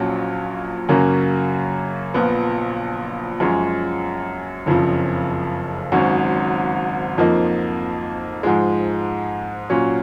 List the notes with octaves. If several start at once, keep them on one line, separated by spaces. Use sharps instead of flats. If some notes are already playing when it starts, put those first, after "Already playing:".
Already playing: A#1 A#2 F#3 C#4
F#2 C#3 F#3 A#3 C#4
A#1 A#2 F3 B3
F#2 F3 G#3 C#4
F#1 F2 C#3 F3
G#1 G#2 F#3 C#4
F2 F3 A#3 D#4
G#2 F3 G#3
A#2 F#3 C#4